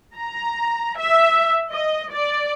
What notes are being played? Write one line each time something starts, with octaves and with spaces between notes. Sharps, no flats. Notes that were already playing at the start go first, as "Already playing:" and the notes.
A#5
E5
D#5
D5